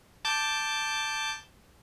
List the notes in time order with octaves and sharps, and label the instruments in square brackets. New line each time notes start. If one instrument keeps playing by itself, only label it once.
[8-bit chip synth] A5 D6 G6